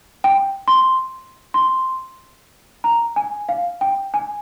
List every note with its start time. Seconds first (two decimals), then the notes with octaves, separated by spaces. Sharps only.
0.24 G5
0.68 C6
1.54 C6
2.84 A#5
3.16 G#5
3.49 F5
3.81 G5
4.14 G#5